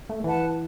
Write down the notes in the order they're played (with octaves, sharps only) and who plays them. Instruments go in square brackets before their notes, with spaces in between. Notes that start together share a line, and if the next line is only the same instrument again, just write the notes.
[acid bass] A3
[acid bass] E3 [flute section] B4 F#5 A5